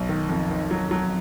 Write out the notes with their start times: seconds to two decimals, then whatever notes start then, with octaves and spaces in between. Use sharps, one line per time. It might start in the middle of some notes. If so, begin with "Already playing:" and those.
Already playing: B1
0.09 D#3
0.29 F2
0.50 D#3
0.71 F#3
0.91 F#3